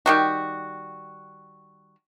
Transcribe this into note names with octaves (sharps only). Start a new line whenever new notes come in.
D#3 G3 F#4